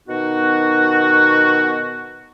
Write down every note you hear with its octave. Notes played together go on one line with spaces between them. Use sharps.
B2 D#3 B3 D#4 F#4